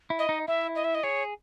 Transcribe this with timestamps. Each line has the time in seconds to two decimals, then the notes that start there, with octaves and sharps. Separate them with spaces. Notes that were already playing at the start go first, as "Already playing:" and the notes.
0.10 E4
0.19 D#5
0.29 D#4
0.47 E4 E5
0.76 D#5
0.84 E5
0.95 D#5
1.03 G#4 C#5